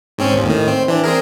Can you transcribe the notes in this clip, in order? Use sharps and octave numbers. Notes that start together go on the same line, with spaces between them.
G#2 C4 C#4
G#1 D#2
A2 D#3
C4
E3 D4
C4 G#4 A#4